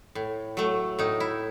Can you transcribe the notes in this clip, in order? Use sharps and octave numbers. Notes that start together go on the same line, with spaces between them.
A2
F#3 A3
A2 D#4
E4